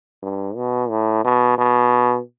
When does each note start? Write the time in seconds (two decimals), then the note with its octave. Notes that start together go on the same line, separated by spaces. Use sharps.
0.22 G2
0.56 B2
0.90 A2
1.25 B2
1.58 B2